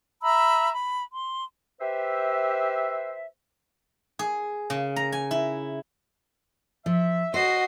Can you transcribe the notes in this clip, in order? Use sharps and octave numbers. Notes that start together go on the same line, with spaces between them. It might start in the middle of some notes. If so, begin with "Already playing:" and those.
E5 A#5 B5 E6
B5
C6
G4 B4 C5 E5
G#4
C#3
A#5
G#5
E4
F3 E5
F#4 C5 D#5 C7